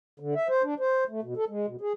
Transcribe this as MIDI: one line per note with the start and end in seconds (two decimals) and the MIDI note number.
0.20 0.34 50
0.35 0.48 76
0.49 0.62 72
0.64 0.74 62
0.80 1.04 72
1.09 1.21 57
1.23 1.34 47
1.37 1.45 69
1.49 1.66 56
1.67 1.76 47
1.81 1.93 68